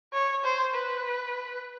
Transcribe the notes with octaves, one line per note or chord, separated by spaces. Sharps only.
C#5
C5
B4